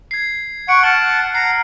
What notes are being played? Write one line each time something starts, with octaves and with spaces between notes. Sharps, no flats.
G#6 C7
F#5 C#6 C#7 D7
F#5 A5 F6 C#7 F#7
A#5 C7 C#7